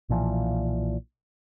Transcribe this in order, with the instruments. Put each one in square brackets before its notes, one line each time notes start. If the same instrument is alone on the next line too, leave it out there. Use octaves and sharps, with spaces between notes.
[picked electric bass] B1 A#2 E3 F3